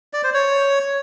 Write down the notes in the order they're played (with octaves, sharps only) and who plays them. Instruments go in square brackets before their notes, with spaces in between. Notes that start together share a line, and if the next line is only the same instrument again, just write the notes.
[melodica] D5
C5
C#5